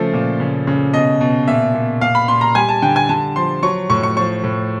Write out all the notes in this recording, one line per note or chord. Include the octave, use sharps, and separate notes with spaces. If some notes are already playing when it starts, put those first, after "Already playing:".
Already playing: C#3 F3 A3 A4
A#2
C#3
C#3
B2 D#5
B2
A#2 E5
A#2
A#2 F5
B5
A#2 C6
A#5
G3 G#5
A5
D3 G5
G#5
D3 A5
F3 C6
F#3 C#6
A2 C#6
C#6
F3 C#6
A2